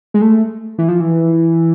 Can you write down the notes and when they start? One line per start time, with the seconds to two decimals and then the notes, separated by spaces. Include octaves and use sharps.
0.14 G#3
0.22 A3
0.78 E3
0.88 F3
1.00 E3